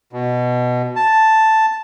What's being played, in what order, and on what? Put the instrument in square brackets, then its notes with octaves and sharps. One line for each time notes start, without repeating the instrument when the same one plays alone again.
[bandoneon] B2
A5